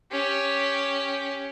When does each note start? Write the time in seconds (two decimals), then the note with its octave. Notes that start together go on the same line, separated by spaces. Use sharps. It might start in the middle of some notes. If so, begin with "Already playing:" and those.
0.12 C#4 G4